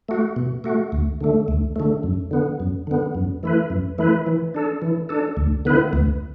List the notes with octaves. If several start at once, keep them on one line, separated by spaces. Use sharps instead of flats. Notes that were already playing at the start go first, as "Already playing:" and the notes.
A3 F#4
B2
A3 F#4
D2
D3 A3
D2
D3 A3
F#2
D3 B3
F#2
D3 B3
F#2
E3 A3 E4 B4
F#2
E3 A3 E4 B4
E3
D4 A4
E3
D4 A4
D2
D3 B3 E4 B4
D2